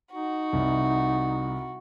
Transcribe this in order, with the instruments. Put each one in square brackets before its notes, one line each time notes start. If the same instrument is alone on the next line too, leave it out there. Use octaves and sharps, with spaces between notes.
[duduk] D#4 [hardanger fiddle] F#4
[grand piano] C2